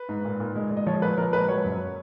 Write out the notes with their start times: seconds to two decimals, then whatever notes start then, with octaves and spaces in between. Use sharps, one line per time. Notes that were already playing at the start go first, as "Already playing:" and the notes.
Already playing: B4
0.09 G#2
0.25 A#2
0.40 A#2
0.55 G#3
0.71 G#3
0.77 D#5
0.86 F3 C#5
1.02 A#2 B4
1.17 F3 A#4
1.33 G#3 B4
1.48 F#3 C#5
1.64 F#2